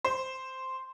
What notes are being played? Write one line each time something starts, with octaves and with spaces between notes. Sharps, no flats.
C5